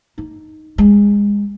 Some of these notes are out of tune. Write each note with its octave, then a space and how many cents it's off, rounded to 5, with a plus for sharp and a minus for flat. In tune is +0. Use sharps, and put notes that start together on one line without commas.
D#4 +0
G#3 -25